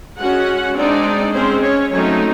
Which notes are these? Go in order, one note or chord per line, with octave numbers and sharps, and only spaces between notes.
G#3 C#4 F#4 F#5
G#3 C4 D4 D#4 D5
G#3 C4 C#4 C5
C#4 C#5
F#3 A3 C4 C#4 D#4 C#5